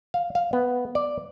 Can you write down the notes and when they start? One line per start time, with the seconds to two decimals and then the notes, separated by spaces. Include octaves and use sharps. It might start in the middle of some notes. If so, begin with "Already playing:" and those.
0.14 F5
0.35 F5
0.53 B3
0.95 D5